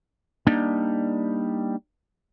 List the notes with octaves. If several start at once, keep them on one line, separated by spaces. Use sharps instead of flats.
G3 A#3 D4 D#4